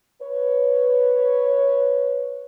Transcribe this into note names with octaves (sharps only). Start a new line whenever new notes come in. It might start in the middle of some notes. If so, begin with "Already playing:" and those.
B4 C#5